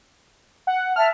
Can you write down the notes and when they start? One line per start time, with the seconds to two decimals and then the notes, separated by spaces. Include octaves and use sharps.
0.67 F#5
0.96 E5 A5 F6